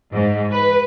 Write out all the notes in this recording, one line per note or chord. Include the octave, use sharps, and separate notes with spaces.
G#2
B4